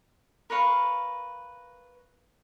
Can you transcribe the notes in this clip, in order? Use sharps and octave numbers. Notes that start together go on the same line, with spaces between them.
A#4 B4 C#5 F5